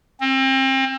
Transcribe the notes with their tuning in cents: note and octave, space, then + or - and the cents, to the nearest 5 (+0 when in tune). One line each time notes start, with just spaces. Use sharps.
C4 +30